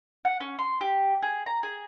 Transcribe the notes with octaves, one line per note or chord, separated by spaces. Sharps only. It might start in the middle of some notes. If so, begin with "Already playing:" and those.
F#5
C#4
C6
G4
G#4
A#5
G#4